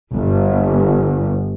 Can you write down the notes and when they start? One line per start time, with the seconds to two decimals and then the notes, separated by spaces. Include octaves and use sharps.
0.14 G1